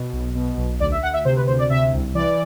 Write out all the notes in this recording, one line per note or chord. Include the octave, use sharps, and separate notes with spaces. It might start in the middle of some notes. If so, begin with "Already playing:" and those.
Already playing: B2
B1
B2
B1
D2 D5
E5
D2 F#5
E5
C3 C5
B4
D2 C5
D5
C3 E5
C2
E3 D5